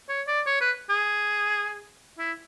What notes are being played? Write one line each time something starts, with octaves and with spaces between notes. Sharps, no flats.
C#5
D5
C#5
B4
G#4
E4